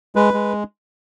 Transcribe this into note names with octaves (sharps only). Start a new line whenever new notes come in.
G#3 B4
G#3